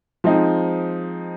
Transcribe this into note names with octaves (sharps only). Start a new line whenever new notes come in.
F3 G#3 C4 D#4